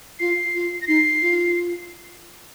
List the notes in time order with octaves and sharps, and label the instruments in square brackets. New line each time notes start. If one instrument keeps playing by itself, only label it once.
[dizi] F4 [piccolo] C7
[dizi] F4
[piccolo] A#6
[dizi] D#4 [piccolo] C7
[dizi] F4